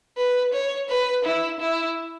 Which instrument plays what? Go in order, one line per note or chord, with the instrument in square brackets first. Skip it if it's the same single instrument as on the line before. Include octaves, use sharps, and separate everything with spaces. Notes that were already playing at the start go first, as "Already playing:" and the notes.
[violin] B4
C#5
B4
E4
E4